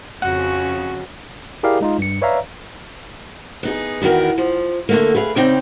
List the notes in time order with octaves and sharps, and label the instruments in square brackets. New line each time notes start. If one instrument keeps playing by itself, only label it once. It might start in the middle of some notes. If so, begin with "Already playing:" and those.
[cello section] F2 C#3 C#4 [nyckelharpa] F#4 [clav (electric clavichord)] F#5
[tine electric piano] E4 G4 G#4 A#4 D5 F5
G#3 D#4 F4
G2 C#7
B4 C#5 D5 E5 F5 A#5
[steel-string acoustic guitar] B3 D#4 G#4
E2 D#3 B3 F#4 A#4
F3
D3 A3 A#3
G#4 B4 F5
C#3 C4 D#4 D5 G5